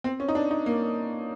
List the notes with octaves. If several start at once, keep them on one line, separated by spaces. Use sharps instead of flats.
C4
C#4
D#4
D4
D#4
A#3